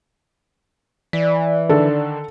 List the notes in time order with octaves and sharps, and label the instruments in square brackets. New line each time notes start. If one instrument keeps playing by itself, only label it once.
[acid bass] E3 [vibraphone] D5 [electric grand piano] B6
[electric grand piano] D3 D#3 D4 [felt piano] A4